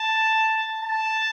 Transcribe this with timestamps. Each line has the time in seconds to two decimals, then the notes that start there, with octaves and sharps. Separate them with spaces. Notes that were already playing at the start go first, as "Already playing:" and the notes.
Already playing: A5
0.83 A5